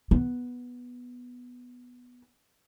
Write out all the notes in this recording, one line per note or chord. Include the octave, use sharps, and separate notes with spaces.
B3